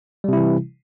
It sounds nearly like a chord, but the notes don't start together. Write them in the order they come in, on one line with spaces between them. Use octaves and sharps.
G3 C3 E4 E3